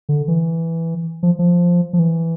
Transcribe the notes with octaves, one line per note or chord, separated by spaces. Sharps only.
D3
E3
F3
F3
F3
E3